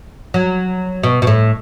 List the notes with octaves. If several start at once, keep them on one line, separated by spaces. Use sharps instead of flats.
F#3
B2
B2
A2